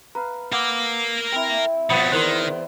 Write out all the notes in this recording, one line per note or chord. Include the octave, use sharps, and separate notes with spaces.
B4 F5 A#5
A#4 F5 F#5 D6 E6
C4 E4 G5
B2 F3 G3 B3 B5 D#6 E6 C#7
E2 D#3 E4 A#4 C5 F#6